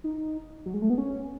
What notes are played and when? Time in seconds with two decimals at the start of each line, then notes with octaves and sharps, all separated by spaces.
0.04 D#4
0.66 F#3
0.74 G#3
0.82 A3
0.90 B3
0.98 C#4